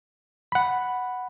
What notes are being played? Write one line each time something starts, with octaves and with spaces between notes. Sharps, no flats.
F#5 B5